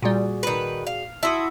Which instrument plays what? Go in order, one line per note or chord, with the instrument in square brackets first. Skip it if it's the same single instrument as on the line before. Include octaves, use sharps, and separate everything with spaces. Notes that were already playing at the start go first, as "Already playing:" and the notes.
[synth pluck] A#2 G3 [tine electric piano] F#4 G#4 D5
[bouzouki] D#3 B4
F5
[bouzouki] E4 F#4 [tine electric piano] A5 C6 D#6